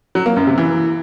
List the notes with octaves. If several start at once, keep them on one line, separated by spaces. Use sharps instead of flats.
F#3
A#3
F#2
C3
E3